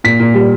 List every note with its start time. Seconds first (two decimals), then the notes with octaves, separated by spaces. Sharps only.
0.04 A#2 B6
0.20 A#2
0.34 G3